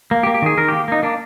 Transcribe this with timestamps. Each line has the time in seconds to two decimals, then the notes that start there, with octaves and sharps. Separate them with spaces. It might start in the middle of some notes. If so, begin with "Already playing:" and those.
0.11 A#3
0.23 G4
0.27 A#3
0.34 G4
0.42 D#3 G#4
0.57 D#3 A#4
0.68 A#3 G4
0.88 A#3 D#4
1.03 A#3 D4